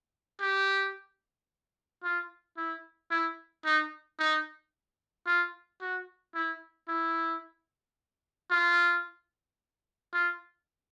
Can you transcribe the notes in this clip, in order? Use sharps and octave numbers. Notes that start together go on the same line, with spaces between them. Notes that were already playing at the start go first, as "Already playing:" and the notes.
G4
F4
E4
E4
D#4
D#4
F4
F#4
E4
E4
F4
F4